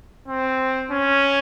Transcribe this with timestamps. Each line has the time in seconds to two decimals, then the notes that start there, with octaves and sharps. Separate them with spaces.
0.28 C4
0.90 C#4